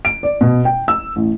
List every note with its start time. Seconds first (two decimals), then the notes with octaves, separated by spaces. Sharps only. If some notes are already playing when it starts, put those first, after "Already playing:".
0.05 D7
0.23 D5
0.41 B2
0.65 G5
0.88 E6
1.16 A1